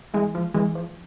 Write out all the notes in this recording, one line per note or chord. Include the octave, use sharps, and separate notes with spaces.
E3 G#3
F3
E3 G#3
F3